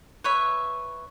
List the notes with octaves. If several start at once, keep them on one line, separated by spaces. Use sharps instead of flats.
B4 C#5 E5